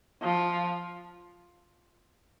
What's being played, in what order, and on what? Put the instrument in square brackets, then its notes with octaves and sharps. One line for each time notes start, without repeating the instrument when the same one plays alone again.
[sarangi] F3